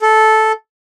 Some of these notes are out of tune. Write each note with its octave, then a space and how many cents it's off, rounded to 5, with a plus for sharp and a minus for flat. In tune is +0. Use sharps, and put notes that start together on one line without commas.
A4 -10